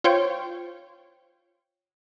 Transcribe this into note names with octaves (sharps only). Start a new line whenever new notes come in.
F4 C5 C#5 G5